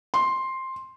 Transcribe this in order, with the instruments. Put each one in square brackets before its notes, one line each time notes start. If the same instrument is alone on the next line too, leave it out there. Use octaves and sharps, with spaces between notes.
[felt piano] C6